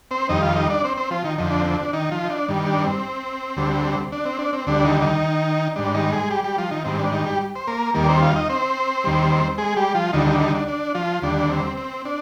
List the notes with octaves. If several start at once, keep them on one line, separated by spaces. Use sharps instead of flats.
C4 C5
F2 D#3 G3 D#4 D#5
F4 F5
D#4 D#5
D4 D5
C4 C5
C4 C5
F3 F4
D#3 D#4
F2 D3 F3 D#4
D4
C4
D4
D#3 D#4
F3 F4
D#4
D4
G2 D#3 G3
D4
C4
D2 D3 G3
D4
C4
D4
C4
D2 D3 G3 D4
D#3 D#4
D#3 D#4
G#2 G3 D4
D#3 D#4
G#3 G#4
G3 G4
G3 G4
F3 F4
D#3 D#4
G#2 D#3 G3 C4
D4
D#3 D#4
G3 G4
C5
A#3 A#4
D#2 D#3 G3 A#3 A#4
D5
C4 C5
F4 F5
D#4 D#5
C4 C5
D#2 D#3 G3
G#3 G#4
G3 G4
F3 F4
D2 D3 D#3 G3 D#4
D#3 D#4
D#3 D#4
D4
D4
F3 F4
D#2 D3 G3 D4
C4
C4
D4